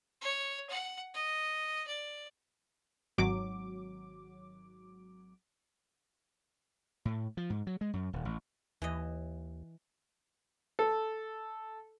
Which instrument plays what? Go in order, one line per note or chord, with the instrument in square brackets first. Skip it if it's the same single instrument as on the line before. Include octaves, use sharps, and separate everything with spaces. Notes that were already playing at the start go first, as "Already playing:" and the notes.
[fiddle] C#5
F#5
D#5
D5
[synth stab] G#1 F#3 D6
[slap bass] A2
F3
G#2
F#3
G#3
F#2
D#1
A1
[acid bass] D#2 [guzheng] E3 D#5
[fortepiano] A4